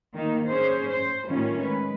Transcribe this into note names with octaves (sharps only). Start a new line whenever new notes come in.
D#3 A#3 D#4
C#4 G#4 C5
C5
A2 D#3 G3 C#4 F4
G#3 B4